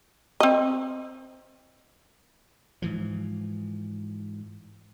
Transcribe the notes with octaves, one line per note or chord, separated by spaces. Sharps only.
C4 D#5
G#2 E3 F3